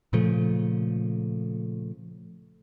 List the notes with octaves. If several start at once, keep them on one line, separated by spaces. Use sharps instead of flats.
A#2 C#3 F3 A3